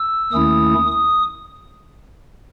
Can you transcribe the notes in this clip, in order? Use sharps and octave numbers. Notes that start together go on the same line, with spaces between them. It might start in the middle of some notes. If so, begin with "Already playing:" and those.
Already playing: E6
D#2 D#3 A3 C#4 E4 D#6
D#6